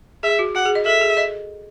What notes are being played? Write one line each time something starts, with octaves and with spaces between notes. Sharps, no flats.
G#4 E5
F#4
F#4 F#5
G#4
D#5
A4 E5
G#4
D#5